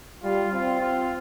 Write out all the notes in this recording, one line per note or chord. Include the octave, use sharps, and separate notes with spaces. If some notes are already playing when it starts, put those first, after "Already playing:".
G3 F4
C4 F4
F4